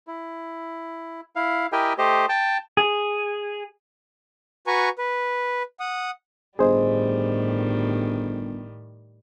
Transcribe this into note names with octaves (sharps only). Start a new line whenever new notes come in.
E4
E4 F5
E4 G4 A#4 D#5 G5 G#5
A3 G4 C5 D#5
G5 A5
G#4
F#4 B4 G#5 A#5 C#6
B4
F#5 D#6
G1 A2 D#3 G3 G#4 C5 D#5